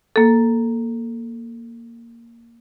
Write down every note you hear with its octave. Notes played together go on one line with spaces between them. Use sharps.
A#3 A4